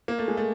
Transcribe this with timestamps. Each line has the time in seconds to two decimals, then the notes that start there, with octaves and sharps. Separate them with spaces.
0.08 A#3
0.19 A3
0.28 G#3
0.37 A3